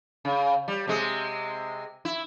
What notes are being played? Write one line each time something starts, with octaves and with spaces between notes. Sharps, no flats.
C#3
G3
C3 G#3
E4